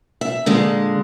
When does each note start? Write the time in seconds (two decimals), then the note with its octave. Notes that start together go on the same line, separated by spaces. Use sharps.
0.21 E5
0.46 A#2 D3 G#3